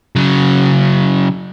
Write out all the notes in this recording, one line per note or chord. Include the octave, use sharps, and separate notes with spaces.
C#3 F#3